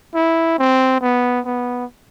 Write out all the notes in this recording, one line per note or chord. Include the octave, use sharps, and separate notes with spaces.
E4
C4
B3
B3